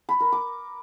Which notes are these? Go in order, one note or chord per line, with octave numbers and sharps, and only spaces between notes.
B5
A#4
D6